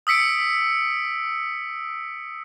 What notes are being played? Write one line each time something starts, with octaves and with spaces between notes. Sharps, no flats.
D#6 E6 B6 C#7 D7